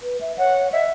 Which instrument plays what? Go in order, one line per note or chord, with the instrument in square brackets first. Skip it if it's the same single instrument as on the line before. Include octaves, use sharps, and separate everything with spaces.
[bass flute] B4
E5
[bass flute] C#5 [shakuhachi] F#5
[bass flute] D#5 [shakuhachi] E5